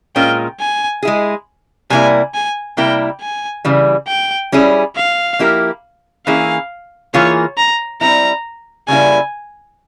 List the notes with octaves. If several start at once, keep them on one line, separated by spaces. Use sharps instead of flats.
A#2 G#3 C#4 F4 A#4 G5
G#5
G#3 E4 G#4
C3 G3 A#3 E4 G#5
G#5
C3 G3 A#3 E4 A#4 G5
G#5
C#3 E3 G3
G5
G3 C#4 E4 G#4
F5
F3 A#3 E4 G4 A#4
E3 A#3 C#4 E4 G#4 F5
E3 A#3 F4 G#4 C#5
A#5
G3 C4 E4 A#5
C#3 G3 A#3 E4 G#5